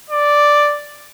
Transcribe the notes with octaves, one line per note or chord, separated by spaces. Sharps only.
D5